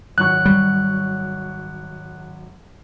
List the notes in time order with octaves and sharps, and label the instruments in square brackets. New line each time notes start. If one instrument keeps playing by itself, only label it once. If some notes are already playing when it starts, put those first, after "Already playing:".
[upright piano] G#1 F#3 C#6 [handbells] F#6
[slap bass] G3